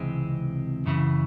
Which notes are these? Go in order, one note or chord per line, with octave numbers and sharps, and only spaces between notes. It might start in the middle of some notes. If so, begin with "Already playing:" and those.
Already playing: C#2 C3 E3 G#3 C4
F#2 C#3 E3